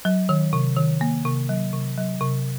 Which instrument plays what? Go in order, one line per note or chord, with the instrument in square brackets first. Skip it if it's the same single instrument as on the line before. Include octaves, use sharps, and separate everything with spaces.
[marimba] F#3
D#3
C3
D#3
A#3
C3
F#3
C3
F#3
C3